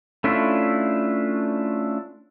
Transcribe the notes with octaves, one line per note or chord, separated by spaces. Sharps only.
A3 C#4 D4 E4 F4